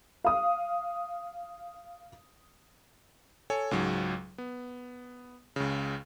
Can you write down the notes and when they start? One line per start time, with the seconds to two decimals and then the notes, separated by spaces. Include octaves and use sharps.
0.25 F5 D#6
3.50 A4 C#5 G#5
3.71 C#2 G#2 F#3
4.38 B3
5.56 C#2 C#3